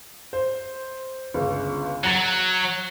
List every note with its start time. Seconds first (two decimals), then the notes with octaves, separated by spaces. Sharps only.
0.33 C5
1.34 G1 C#2
2.04 F#3 F#5 A#5 A6